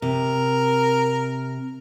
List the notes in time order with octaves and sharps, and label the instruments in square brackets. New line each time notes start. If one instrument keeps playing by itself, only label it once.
[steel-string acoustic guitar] C3 [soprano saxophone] A#4